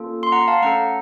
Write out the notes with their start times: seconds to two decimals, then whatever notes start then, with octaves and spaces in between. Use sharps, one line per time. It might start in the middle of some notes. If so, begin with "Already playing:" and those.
Already playing: A#3 C#4 F4 A4
0.23 C6
0.32 F#5 A#5
0.48 F5 A5
0.62 A3 C#4 A4 F#5 A#5